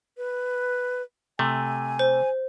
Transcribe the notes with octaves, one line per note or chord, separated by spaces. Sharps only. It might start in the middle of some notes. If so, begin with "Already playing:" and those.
B4
C3 A3 G#5
C5